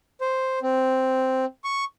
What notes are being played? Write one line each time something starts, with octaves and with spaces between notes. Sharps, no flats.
C5
C4
C#6